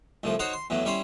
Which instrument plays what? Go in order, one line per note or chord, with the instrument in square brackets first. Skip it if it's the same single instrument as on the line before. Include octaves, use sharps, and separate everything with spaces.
[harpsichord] C2 A2 F3
D#4 F#4 C5 C#5
C6
E2 A2 F#3
G3 C#4 E4 C5